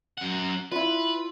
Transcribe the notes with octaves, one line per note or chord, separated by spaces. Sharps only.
F#2 F#5
E4 F4 B4